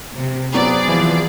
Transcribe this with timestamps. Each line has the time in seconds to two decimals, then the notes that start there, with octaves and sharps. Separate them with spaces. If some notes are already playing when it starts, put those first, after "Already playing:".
0.16 C3
0.54 F#3 B3 C4 G#4 D5
0.88 E3 F3